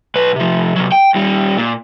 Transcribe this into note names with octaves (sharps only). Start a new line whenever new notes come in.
B1 B4
C3 F3
C3 F#3
G5
D#2 G3
A#2